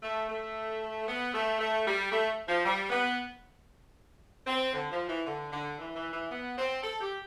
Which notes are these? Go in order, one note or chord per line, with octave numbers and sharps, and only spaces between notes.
A3
A3
B3
A3
A3
G3
A3
F3
G3
B3
C4
D3
F3
E3
D3
D3
E3
E3
E3
B3
C4
A4
G4